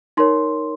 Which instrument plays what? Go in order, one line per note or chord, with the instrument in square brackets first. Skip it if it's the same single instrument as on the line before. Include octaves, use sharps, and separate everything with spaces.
[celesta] D#4 A#4 C#5 C6